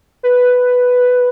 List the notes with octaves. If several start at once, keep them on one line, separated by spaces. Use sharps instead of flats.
B4